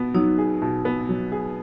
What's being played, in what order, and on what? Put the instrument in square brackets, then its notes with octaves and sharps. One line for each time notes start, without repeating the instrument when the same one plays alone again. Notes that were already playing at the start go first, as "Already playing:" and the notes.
Already playing: [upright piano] B2 B3
[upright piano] F#3 [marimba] D#4
[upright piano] G#4
B2
B3
F#3
G#4